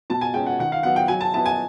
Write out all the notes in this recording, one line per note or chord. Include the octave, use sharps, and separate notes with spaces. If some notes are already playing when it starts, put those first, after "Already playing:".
B2 A5
G#5
G#3 C#4 G5
F#5
D#3 F#5
F5
F#3 B3 F#5
G5
F#3 G#5
A5
B3 E4 A5
G#5